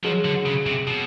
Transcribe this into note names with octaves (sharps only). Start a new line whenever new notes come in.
F3 F#3 G#3
D3
C#3
C3
B2